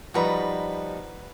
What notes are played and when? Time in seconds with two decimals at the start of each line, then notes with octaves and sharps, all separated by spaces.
0.14 F3 G3 D#4 F#4 B4 A#5